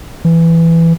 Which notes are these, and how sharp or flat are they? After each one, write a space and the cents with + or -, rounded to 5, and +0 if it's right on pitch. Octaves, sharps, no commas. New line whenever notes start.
E3 +10